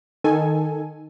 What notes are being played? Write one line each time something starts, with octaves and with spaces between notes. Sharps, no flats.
D#3 A4 G#5